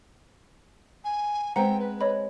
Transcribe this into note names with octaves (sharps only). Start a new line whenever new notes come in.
G#5
G#3 B3 C4 C5 F#5 G5 A#5
B4
C#5 D#5 B5